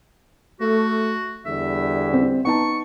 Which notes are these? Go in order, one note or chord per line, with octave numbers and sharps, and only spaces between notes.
A3 F#4
E2 D3 G3 E5
C4
B3 D#4 A5 C#6